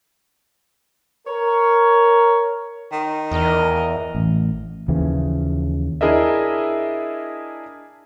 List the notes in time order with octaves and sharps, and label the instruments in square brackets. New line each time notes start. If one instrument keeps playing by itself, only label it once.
[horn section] A#4 C#5
[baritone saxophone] D#3
[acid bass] E2 [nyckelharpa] A#4 D#5
[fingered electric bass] A1
[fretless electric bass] D#2 C#3 E3 F3
[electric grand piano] D4 E4 G#4 A#4 D#5 E5